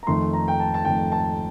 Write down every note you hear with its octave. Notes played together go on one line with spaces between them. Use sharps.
A#5
F2 D#3 A3 C6
A#5
G5
A5
A5
F2 D#3 A3 G5
A5